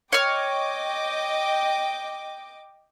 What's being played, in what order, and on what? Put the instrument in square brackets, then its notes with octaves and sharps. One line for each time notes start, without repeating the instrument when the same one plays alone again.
[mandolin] C#5 F6 [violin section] D#5 G5 D6